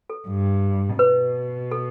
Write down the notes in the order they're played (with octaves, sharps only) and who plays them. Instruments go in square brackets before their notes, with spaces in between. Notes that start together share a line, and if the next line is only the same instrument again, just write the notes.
[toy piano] A4
[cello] G2
[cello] B2 [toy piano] B4
[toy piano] A4